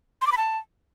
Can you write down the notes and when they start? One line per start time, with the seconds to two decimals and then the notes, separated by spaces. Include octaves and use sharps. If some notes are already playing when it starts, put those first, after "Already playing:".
0.22 C6
0.27 D6
0.32 B5
0.37 A5